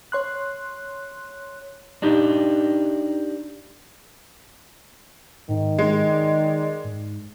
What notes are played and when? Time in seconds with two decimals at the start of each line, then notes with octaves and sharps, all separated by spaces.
0.12 C#5 C6 F#6
2.02 D4 D#4 G4
5.49 G#2 D#3
5.79 G#3
6.11 D5
6.84 G#2